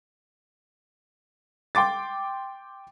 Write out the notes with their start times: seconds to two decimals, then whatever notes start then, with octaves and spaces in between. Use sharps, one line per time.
1.75 G5 C6 D6 A6